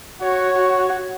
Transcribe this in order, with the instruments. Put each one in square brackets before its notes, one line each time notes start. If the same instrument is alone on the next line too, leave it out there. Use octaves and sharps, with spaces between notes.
[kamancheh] F#4 [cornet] C#5
[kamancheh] F#4